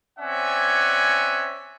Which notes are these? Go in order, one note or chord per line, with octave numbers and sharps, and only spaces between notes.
C4 C#4 D5 E5 F#5 G#5